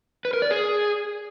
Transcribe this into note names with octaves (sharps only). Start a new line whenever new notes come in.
B4
A#4
D5
G#4